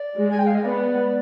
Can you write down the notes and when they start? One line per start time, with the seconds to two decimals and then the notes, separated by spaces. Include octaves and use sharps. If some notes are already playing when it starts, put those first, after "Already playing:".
Already playing: D5
0.16 G#3
0.31 G#5
0.38 G5
0.47 F5
0.55 D#5
0.63 B3 D5